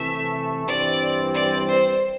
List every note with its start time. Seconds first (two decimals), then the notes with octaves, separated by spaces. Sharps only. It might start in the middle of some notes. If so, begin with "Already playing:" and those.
Already playing: C3 E3 A3 E5
0.67 G2 E3 G3 C4 D5
1.35 D5
1.69 C5